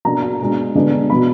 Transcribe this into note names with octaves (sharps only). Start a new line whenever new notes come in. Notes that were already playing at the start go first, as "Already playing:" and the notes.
B2 F#3 A#3 D4 A#5
A#5
B2 G#3 D4
D3 G#3 B3 D4
B2 F#3 D4 B5